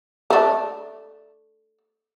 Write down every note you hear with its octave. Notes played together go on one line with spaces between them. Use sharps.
A3 D4